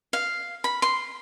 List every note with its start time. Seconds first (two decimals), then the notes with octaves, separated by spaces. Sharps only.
0.13 F5
0.64 B5
0.82 C6